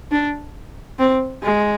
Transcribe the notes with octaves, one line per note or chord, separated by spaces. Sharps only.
D4
C4
G#3